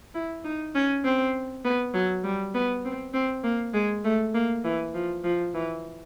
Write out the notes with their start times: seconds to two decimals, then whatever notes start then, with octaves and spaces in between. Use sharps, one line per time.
0.14 E4
0.44 D#4
0.75 C#4
1.04 C4
1.65 B3
1.94 F#3
2.24 G3
2.54 B3
2.85 C4
3.14 C4
3.44 A#3
3.74 G#3
4.04 A3
4.34 A#3
4.64 E3
4.94 F3
5.24 F3
5.54 E3